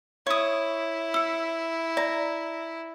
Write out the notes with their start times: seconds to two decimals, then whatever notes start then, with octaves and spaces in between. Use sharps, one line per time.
0.27 E4 C#5 D#6
1.14 E6 C#7
1.97 D5 A#5